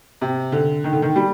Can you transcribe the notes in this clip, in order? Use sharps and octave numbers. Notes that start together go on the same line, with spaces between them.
C3
D3
D#3
D3
D#3
G3